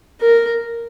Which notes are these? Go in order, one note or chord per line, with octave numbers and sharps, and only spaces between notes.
A#4